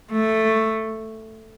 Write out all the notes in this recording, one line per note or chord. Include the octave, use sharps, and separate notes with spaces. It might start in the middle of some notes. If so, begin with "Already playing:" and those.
A3